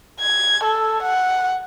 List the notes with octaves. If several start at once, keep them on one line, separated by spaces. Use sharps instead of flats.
G#6
A4
F#5